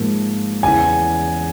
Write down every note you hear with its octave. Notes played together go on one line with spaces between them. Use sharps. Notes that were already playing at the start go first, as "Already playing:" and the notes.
Already playing: G#2 F3 A#3
E2 C#3 E3 G#5